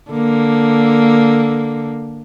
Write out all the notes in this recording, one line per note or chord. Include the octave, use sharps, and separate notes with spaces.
D3 A#3